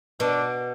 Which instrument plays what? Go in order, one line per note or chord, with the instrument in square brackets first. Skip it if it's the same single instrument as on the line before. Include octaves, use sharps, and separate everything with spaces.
[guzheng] B2 [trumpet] D4